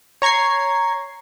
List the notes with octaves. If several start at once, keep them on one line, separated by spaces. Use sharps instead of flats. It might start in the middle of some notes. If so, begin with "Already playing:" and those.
C#5 A#5 C#6 G#6 C7